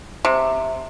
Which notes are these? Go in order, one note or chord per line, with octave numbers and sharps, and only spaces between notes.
C3